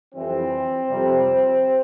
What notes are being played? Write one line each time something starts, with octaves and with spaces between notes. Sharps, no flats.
F2 E3 G3 C4
F2 C3 G3